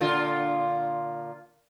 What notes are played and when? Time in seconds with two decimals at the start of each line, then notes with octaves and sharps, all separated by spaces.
0.01 A#2 D3 F4